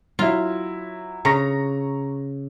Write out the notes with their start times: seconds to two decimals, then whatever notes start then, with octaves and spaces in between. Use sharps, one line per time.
0.19 F#3 E4 F4
1.25 C#3 A#5 C#6 A#6